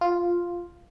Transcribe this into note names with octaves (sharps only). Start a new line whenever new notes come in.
F4